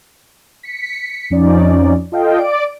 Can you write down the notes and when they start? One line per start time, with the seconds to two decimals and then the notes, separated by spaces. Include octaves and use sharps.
0.63 B6 C#7
1.30 F2 F3 C#4 D#4 D5
2.12 F4 A4 D#5 F5 G5
2.39 D5 D7